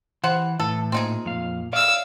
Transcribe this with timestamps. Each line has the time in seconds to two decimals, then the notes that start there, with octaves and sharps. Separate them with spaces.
0.24 C3 E3 C5 F#5
0.60 A2 E3 A4
0.92 A#2 C4 D#4 G#4
1.25 F2 F5
1.73 C#5 D5 E5 F5 E6